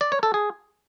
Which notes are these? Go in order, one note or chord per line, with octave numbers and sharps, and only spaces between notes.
D5
C#5
A4
G#4